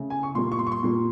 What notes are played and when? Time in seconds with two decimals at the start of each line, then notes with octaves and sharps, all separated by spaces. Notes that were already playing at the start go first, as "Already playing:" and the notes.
Already playing: C#3 A3
0.10 G#5
0.23 C#6
0.35 A#2 G3 A#3 C6
0.52 C#6
0.59 C6
0.67 C#6
0.72 C6
0.83 A#2 G3 A#3